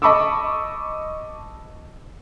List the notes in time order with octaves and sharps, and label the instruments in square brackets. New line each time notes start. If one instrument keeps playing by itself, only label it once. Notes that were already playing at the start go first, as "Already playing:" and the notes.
[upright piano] D#5 A5 B5 C#6 D6 E6